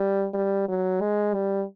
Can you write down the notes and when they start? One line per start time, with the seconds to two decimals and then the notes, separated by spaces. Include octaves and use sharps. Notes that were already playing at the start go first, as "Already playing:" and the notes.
Already playing: G3
0.34 G3
0.68 F#3
1.01 G#3
1.34 G3